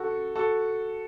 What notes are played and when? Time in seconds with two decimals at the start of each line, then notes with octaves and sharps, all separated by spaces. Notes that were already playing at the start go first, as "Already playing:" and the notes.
Already playing: F#4 A4
0.36 F#4 A4